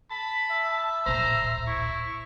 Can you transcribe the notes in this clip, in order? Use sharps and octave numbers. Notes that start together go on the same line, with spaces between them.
A5 B5
E5
D1 A#1 C5 A#5
E4 C#6